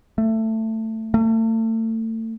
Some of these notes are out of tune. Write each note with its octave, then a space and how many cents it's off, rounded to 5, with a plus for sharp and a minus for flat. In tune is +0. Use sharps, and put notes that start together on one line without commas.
A3 +15
A3 +35